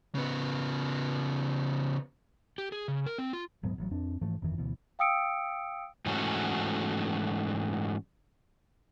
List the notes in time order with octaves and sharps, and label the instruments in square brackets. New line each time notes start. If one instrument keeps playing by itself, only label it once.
[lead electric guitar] C#3 B3
[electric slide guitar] G4
G#4
C#3
A#4
C4
F4
[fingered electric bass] D#1 G#2 F#3 B3
A1 F#3
F2 C4 D4
G#2 E3 F3 A3
G1 F2 D#3 E3
D2 B2 E3
[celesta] F5 G5 D#6 E6 C#7 D7
[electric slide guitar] G#2 E3 F#3 A3 C#4 F#4